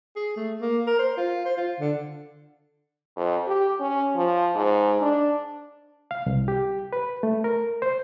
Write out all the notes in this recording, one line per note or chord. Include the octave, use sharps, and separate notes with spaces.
G#4
A3
A#3
A#4
C5
F4
C5
F4
D3
F2
G4
C#4
F3
G#2
D4
F5
C2
G4
B4
A3
A#4
C5